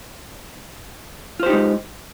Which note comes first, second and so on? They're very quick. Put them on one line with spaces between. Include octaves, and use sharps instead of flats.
F4 C5 G4 D#4 G#3